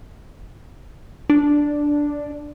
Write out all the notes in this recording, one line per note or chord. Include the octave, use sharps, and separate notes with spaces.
D4